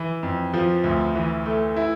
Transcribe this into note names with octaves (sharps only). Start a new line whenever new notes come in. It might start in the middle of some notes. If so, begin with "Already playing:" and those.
Already playing: E3
F2
F3
D2
E3
A3
E4